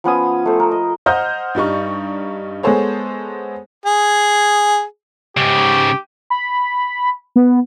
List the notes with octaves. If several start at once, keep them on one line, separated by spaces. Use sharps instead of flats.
F3 B3 C#4 D#6
A3 C5
A#4
D#5
C5 D#5 F#5 A#5 F6 G6
G2 G3 D#4 C#6
G#3 B3 G#4 A4 C5 C#5
G#4
G#2 C#3 G4
B5
B3